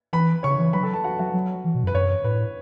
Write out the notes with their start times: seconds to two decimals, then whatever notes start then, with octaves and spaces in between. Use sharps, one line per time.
0.13 E3 B4 B5
0.43 C#3 C#5 C#6
0.58 E3
0.73 F#3 B4 B5
0.83 A4 A5
0.93 A4 A5
1.04 F#4 F#5
1.19 F#3 F#4 F#5
1.34 F#3
1.64 E3
1.75 B2
1.84 F#2
1.87 B4
1.94 F#2 C#5
2.24 A2 B4